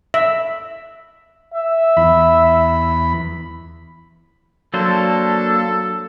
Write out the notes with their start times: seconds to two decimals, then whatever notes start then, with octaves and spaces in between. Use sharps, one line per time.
0.14 E5
1.54 E5
1.97 E2 B5
4.74 F#3 A#3 D4 A4 C5